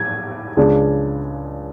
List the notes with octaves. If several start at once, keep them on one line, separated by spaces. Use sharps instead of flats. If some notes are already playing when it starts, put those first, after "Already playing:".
Already playing: G#6
C#2 C#3 G#3 D4